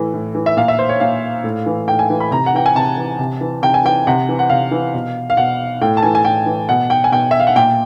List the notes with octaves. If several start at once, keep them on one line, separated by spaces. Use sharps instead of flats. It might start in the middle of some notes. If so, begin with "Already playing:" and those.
Already playing: A2 E3
A2
E3
E5
A#2 F5
E5
C5
C#5
A#2 F5
A2
E3
A2 G5
G#5
E3
B5
C3 A#5
F#5
E3 G5
G#5
C3 A5
E3
C3
E3
C3 G5
G#5
E3 G5
C3 F#5
E3
F#5
C3 F5
E3
B2
F5
B2 F#5
A2 G5
A5
E3 G#5
G#5
A2 G5
E3
B2 F#5
G5
G#5
B2 G5
E5
F5
F#5
A#2 G5